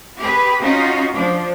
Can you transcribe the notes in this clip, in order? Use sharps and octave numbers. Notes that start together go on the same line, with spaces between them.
G4 G#4 B4
C#4 D#4 F4 F#4
F3 D4